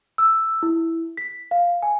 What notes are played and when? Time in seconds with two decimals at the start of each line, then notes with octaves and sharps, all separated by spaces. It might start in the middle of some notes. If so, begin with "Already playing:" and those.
0.18 E6
0.63 E4
1.17 B6
1.51 F5
1.82 G#5